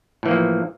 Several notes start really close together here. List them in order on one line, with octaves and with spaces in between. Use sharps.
A2 E3 A#3 F3